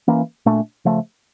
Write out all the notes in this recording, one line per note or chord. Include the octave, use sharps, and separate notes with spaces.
E3 A#3 C#4
A#2 A3 D4
C#3 F3 A3